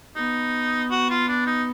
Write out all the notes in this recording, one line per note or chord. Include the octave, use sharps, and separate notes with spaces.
B3 D#4
F#4
F4
D4
D#4